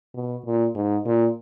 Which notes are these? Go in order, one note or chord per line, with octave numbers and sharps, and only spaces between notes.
B2
A#2
G#2
A#2